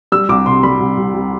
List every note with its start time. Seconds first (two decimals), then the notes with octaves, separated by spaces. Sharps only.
0.12 G3 E6
0.29 C2 D6
0.46 C3 C6
0.63 G3 B5
0.80 C2
0.98 C2
1.14 C2